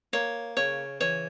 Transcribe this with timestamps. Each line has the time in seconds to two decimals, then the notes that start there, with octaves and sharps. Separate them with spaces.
0.13 A#3 C#5
0.57 C#3 C#5
1.00 E3 C#5